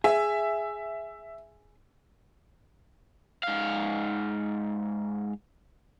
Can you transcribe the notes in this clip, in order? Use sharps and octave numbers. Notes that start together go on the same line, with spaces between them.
G#4 E5
G#2 F5